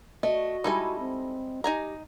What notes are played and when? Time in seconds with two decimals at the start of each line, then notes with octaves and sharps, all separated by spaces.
0.23 A3 F#4 D#5
0.64 G3 G#3 D#4 E4 A4 G#5
0.99 C4
1.64 D#4 G4 G#5 A#5